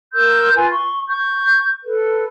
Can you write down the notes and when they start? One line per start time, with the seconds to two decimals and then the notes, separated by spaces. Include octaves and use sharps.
0.14 A#4 C6 E6 G6
0.55 F4 B4 G#5
0.70 C6 C#6
1.07 C#6 G6
1.84 A4 B4